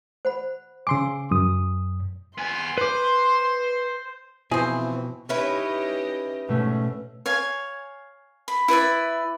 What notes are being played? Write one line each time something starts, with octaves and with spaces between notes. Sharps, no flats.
C5 F#5 B5
C#3 G#5 C6 D6 E6
F#2 D#6
B3 G#5 C6
B4 C5 D6
B2 E3 F3 C4 E4 G#4 C5
C#4 D#4 E4 G4 B4 D#5
G#2 B2 A3 C#4
C#5 F5 G#5
B5
E4 B4 D5 E5